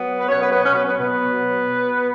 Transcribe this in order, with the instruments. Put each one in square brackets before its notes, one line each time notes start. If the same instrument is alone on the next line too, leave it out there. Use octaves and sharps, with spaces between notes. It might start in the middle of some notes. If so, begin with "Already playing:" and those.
Already playing: [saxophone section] F#3 B3
B4
B2 F#3 C#4 C#5
B3 B4
B3 B4
B2 F#3 C#4 C#5
B3 B4
B3 B4
B2 F#3 B3 B4
B2 F#3